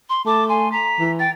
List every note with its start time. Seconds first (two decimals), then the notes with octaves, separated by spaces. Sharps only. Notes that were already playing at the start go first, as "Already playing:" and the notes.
0.09 C6
0.26 A3 A5 D6
0.49 G#5 C6
0.72 A#5 B6
1.00 E3
1.19 G5 A6